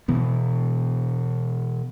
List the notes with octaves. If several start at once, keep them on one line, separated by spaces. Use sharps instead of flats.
B2 E3 B3